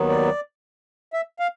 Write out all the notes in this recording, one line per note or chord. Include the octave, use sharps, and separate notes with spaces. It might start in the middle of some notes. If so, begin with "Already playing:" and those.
Already playing: D#2 D#3 F#3 B3
D5
E5
F5